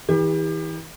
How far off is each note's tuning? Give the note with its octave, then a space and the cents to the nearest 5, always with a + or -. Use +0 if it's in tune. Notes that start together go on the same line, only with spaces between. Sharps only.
E3 -35 G4 +30